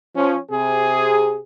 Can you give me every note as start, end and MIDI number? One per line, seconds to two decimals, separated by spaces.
0.16 0.38 53
0.16 0.38 61
0.51 1.41 48
0.51 1.41 68